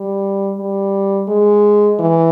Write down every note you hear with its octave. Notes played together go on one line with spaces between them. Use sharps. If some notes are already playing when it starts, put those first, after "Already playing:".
Already playing: G3
G3
G#3
E3